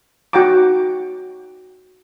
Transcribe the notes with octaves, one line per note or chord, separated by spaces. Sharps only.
D#4 F#4 F#5 G5 A#5 D6